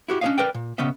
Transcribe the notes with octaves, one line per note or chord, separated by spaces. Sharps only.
E4 F#4 G4
C#4 D4 E4 C#5 D#5 F5
A#4 B4 D5 G5
A#2
B1 C#3 B3 C#4 D#5 E5